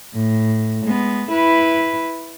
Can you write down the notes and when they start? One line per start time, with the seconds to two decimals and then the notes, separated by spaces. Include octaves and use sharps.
0.14 A2
0.85 G#3 B3
1.29 E4 B4